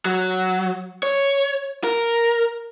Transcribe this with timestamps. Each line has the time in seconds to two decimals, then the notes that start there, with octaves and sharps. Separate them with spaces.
0.05 F#3
1.03 C#5
1.84 A#4